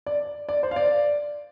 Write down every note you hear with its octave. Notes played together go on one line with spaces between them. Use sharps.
D5
D5
C5
F5
D5